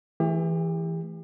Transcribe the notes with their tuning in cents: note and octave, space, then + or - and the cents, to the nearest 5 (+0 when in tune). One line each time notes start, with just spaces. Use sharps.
E3 +0 A3 -10 G4 +40